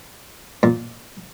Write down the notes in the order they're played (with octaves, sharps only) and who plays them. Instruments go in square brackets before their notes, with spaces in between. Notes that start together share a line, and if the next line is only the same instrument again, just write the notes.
[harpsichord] A#2